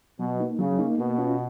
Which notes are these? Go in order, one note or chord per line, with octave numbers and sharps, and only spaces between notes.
B2 F#3
A#3 D#4
C#3 F#3
A#3 D#4
B2 A#3
C#4 F4